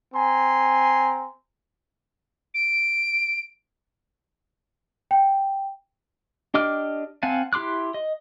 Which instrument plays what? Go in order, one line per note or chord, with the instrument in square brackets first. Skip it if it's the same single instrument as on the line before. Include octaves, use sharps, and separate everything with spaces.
[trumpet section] C4 G#5 A#5 C6
[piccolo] D7
[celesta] G5
[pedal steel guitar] D4 G4 D#5 D6 F6
C4 F5 F#5 G#5 A5
E4 G4 C6 D6 F#6
D#5